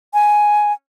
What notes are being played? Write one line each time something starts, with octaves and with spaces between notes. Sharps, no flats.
G#5